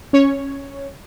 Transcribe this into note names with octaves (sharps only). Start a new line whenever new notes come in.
C#4 C#5